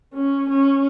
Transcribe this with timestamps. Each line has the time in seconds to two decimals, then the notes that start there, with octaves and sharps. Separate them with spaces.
0.13 C#4
0.50 C#4